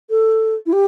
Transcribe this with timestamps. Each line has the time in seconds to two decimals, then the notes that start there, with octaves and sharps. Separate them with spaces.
0.10 A4
0.66 E4
0.72 G4